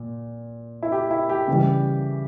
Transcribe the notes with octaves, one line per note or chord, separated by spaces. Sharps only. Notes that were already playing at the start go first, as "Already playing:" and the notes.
Already playing: A#2
E4
G4
E4
G4
C#3 E3 G3